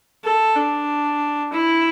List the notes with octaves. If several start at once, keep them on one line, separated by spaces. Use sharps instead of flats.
A4
D4
E4